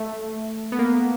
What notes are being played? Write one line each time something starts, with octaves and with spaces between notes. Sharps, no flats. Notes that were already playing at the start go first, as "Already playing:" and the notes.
Already playing: A3
B3
A#3